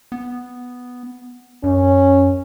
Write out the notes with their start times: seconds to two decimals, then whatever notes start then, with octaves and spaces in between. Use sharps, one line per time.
0.12 B3
1.64 F#2 C#4